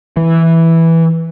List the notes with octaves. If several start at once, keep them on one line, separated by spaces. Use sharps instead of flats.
E3